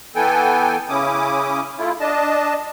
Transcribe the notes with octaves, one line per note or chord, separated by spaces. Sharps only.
E3 B3 A4 G5 G#5
C#3 C#4 E4 D6 D#6
A3 E4 F4
D4 D#5 A5